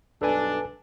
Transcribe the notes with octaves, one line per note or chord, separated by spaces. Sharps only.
B1 G2 D4 A4 B4 G#5